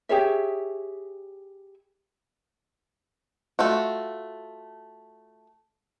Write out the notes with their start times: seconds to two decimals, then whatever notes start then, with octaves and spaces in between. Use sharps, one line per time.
0.09 G4 G#4 C#5 E5
3.59 A3 F4 F#4